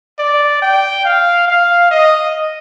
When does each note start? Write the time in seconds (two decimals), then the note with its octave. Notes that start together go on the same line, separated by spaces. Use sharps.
0.19 D5
0.62 G5
1.05 F5
1.48 F5
1.91 D#5